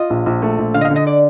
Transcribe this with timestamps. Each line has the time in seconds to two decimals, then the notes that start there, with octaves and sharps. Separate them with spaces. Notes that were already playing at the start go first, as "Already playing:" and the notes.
Already playing: F4 D#5
0.10 A#1
0.26 A#1
0.42 A3
0.59 A#1
0.74 D3 F5
0.81 D#5
0.85 F5
0.90 D3
0.96 D#5
1.07 D5